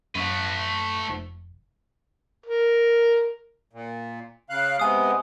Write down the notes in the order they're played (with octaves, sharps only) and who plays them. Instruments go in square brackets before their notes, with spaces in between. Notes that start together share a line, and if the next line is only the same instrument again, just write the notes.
[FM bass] F#2 [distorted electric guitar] A3 B4
[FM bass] F1
[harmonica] A#4
[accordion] A#2
C#3 F5 F#6
[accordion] C3 G#3 B3 [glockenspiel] G#5 D#6